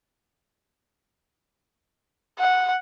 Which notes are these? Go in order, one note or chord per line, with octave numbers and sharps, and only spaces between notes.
F#5